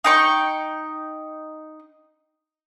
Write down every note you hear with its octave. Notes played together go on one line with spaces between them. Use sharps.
D#4 G5 C#6